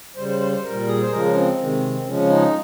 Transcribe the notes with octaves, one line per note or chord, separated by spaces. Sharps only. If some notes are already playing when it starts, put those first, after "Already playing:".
C#3 G3 C5
C5
C5
C5
A#2 G3 A#4
G#4
C5
C#3 F3 G#3 A#4
C#4
C4
C3 D#3 G#3
C#3 F3 G#3 C#4
D#4